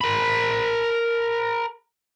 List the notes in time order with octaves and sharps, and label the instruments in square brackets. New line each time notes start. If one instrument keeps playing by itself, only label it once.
[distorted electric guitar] A#4 B5